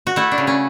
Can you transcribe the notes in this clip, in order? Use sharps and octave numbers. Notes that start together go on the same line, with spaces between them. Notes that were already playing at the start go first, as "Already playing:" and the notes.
F#4
A3 E4
D4
C#3
C#4